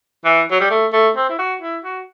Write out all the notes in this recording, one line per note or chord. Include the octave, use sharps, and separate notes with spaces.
E3
F#3
G3
A3
A3
C4
E4
F#4
E4
F#4